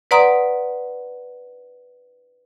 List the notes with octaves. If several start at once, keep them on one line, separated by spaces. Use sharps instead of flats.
B4 D5 F#5 A#5 C6 D#6